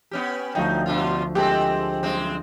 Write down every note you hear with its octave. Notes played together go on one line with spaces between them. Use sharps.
B3 C#4 G4
D2 F3 B3 D#4 G5
B2 D3 F4
G#3 C4 G4 A4
G5
F#2 G#3 C4